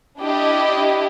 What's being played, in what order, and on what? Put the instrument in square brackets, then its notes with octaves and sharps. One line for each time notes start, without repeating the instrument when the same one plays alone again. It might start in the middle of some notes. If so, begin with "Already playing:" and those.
[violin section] D4 E4 G4 D#5